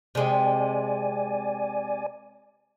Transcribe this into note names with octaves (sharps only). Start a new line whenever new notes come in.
C3 G#3 D5 G#5